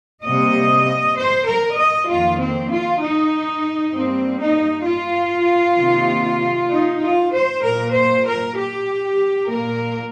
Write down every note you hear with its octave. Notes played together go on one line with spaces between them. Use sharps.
C3 G3 A#3 D#5
C5
A#4
D#5
F2 D#3 A#3 F4
C4
F4
D#4
G2 G3 A#3 C4
D#4
F4
C3 D#3 A#3
D#4
F4
C5
A#2 A#3 A#4
C5
A#4
G4
A#2 A#3 A#4